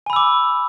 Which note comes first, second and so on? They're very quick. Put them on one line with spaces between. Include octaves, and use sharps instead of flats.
G#5 B5 E6 D6